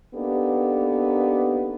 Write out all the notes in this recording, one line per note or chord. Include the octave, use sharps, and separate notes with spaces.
A#3 B3 D4 D#4 G4 A4